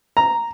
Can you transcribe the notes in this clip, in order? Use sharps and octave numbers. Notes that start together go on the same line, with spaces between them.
A#5